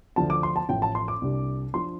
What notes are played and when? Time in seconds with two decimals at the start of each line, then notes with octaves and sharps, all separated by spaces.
0.16 D2 D3 F3 D4 A5
0.30 D6
0.43 C6
0.56 A5
0.69 A1 A2 F3 G5
0.82 A5
0.95 C6
1.08 D6
1.22 C2 C3 G3 D4
1.73 F3 D4 C6